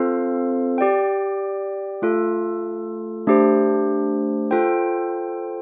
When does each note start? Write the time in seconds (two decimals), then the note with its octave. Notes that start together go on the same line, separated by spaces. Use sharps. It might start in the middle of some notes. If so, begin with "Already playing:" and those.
Already playing: C4 F4 A4 C5 F5
0.78 G4 D5 G5
2.02 A3 F4 A4
3.27 A3 D4 G4 C5
4.51 F4 A4 C5 G5